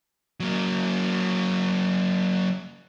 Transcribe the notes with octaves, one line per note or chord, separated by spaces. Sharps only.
F#3 A#3